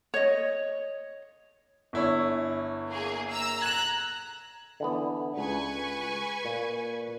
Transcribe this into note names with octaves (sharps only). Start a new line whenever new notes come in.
C#5 D#5
G1 E4 C#5
A#3 G#4
A#5 E6
A#5 F#6 G#6 E7
D3 E3 B3
C#2 B4 G#5 C#6
A#2